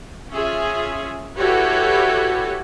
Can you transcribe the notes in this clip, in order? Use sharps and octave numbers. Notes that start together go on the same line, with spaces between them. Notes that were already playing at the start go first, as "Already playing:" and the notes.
C#4 F4 G#4 E5
E4 F#4 G4 A4 B4 C#5